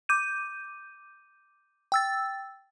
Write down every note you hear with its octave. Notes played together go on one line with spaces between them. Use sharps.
D6 G6 D#7
G5 E6 A6